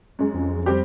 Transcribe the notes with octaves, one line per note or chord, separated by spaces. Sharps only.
F#2 G#3
F2
G3 C4 G4